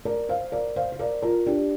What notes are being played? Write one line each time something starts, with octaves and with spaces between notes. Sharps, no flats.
A#4 D5
C5 F5
A#4 D5
C5 F5
C5
A#4 D5
F4 A#4
D4 G4